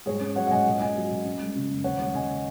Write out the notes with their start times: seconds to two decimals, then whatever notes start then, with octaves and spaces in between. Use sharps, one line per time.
0.06 G#2 G#4 C#5
0.21 C#4
0.36 F#3 C#5 F#5
0.47 F#5
0.51 G#2 D#5 G#5
0.66 A#2
0.81 C#4 D#5 G#5
0.96 F#3
1.10 A#2
1.25 C#4
1.40 G#3
1.56 C#3
1.69 F#2
1.84 D#2 C#5 F#5
1.99 G#3
2.14 C#3 D#5 G#5